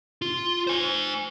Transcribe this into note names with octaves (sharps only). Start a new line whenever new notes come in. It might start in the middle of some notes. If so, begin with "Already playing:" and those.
F4
C5 G#5